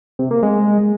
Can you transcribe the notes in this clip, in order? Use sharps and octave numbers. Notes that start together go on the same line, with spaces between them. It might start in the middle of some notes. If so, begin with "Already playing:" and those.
C3
A#3
G#3